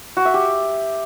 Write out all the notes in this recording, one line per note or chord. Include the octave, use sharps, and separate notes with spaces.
F#4
E5
G4